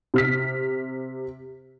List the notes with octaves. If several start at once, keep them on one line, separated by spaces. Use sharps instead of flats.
C3 F6 B6